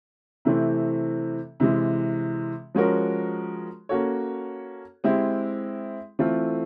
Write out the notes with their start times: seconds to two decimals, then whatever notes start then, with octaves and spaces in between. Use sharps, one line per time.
0.45 C3 E3 A3 C4
1.60 C3 E3 G#3
2.75 F3 G#3 C#4 F#4 A#4
3.89 A#3 C#4 F#4 A4 C#5
5.04 G#3 C4 E4 G4
6.19 E3 A3 C4 F4 A4